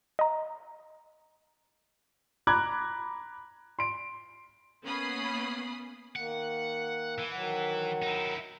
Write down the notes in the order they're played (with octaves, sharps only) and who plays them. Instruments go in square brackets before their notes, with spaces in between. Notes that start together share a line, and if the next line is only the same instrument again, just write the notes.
[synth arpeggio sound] D#5 A#5
[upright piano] A#5 B5 D6 F#6 G#6
C6 D7
[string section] A#3 B3 C#4 B5 D#6 C7
[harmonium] D#3 A#3 [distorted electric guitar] F#5
[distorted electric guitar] E3
[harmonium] D#3 F#3 F#5
[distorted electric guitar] D#4 E4